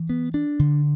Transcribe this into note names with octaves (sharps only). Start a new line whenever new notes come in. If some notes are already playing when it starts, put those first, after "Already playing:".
Already playing: E3
B3
D4
D3